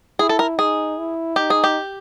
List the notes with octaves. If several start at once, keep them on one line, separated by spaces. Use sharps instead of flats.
E4 G#4
A4
A#4
D#4 G#4
E4
D#4 G4
G#4
G4